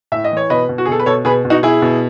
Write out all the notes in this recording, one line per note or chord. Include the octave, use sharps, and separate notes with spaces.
A2 E5
D#5
E3
C#5
B2 B4 D#5
B2
F#4
G#4
B2 A4
B4
B2 A4 C#5
B2 G#4 B4
B2
D#4 F#4
B2 E4 G#4
B2